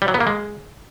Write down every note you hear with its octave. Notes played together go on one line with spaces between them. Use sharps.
G3
F#3
B3
A#3
G#3